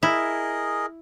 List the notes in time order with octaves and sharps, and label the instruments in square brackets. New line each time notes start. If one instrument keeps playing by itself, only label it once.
[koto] E4 [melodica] G#4 A#4 D#5